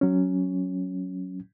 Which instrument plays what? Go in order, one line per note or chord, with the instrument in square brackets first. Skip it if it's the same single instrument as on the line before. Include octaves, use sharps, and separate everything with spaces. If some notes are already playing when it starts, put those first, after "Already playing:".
[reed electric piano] F#3 C#4